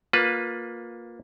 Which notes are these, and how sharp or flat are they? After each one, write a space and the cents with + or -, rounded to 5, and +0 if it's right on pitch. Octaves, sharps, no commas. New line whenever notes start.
A#3 +0 F4 +20 B4 +0